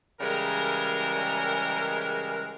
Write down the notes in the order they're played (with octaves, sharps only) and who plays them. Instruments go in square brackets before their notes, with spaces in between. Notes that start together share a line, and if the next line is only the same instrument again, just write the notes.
[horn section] C#3 E3 G3 G#3 A#4